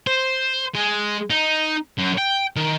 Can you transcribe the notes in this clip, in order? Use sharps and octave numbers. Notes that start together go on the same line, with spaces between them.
C5
G#3
D#4
F#2
G5
D#3